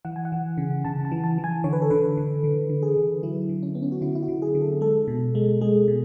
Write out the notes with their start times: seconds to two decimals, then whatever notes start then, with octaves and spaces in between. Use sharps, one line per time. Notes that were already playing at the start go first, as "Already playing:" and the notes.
0.05 E3 F#5
0.16 G#5
0.25 F#5
0.32 E3
0.58 C#3
0.85 C#3 A5
1.05 A5
1.12 E3
1.24 A5
1.38 E3
1.44 G#5
1.64 D3 C#5
1.73 B4
1.82 A4
1.90 D3 B4
2.17 D3
2.44 D3
2.69 D3
2.83 G#4
2.97 D3
3.23 F#3 E4
3.49 D3
3.63 C#4
3.75 B3
3.82 C#4
3.92 F#4
4.02 D3 E4
4.15 E4
4.23 F#4
4.28 D3
4.42 G#4
4.55 D3
4.62 A4
4.81 G#3 A4
5.08 B2
5.35 G#3
5.61 G#3 G#4
5.88 B2